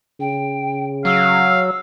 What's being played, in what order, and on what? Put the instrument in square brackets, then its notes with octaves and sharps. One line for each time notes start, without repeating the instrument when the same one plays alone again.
[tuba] C#3 [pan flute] G5
[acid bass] F#3 [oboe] F5 [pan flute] E6